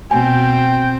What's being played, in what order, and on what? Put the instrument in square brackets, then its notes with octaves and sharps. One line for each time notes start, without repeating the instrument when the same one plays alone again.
[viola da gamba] B2 [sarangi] C4 [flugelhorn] G5 [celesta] G#5